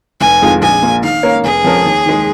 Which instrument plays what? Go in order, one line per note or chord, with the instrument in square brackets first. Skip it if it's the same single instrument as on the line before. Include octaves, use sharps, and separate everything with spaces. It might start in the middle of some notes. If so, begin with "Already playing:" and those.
[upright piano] F1 [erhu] G#5
[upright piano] F2 D#3 G#3 F4
[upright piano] A#1 [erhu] G#5
[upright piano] A#2 A#3
[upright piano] D#3 [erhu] F5
[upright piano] A#3 C#4 A#4 C#5
[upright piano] F1 [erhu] G#4
[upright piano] F2 F3 C#4 A#4
D#2
D#3 G#3